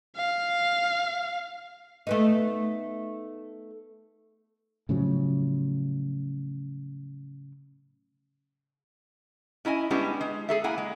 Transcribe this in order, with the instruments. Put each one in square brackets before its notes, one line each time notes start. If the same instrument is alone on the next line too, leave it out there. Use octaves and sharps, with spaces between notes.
[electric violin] F5
[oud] A3 B3 D#4
[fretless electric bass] A2 C#3 F3 F#3
[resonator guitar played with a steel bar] C#4 E4 D#5 G#5
G3 G#3 B3 C#4 D4 E4
G#3
G#4 A4 E5
A#3 E4 F#5 G#5
G#3